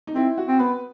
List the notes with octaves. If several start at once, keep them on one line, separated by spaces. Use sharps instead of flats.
D#4
C4 E4
F#4
C4
B3 B4